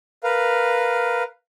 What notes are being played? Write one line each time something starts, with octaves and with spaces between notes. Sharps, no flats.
A#4 B4 F5